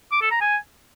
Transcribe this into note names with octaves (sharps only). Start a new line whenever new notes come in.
D6
A4
A#5
G#5